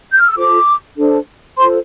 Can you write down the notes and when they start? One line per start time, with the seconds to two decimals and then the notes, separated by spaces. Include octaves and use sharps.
0.11 G6
0.19 F6
0.28 E6
0.36 F4 A4 C5 D6
0.97 D4 A4 C5
1.57 F4 A4 C5 C6